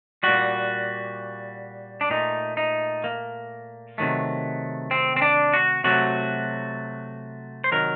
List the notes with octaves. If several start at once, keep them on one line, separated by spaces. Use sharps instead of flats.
A#2 G3 F#4
D4
A#2 A3 D#4
D#4
A#3
C3 D#3 F#3 A3
C4
C4
D4
F#4
C3 F#3 A3 F#4
C5
C3 D#3 F#3 A#4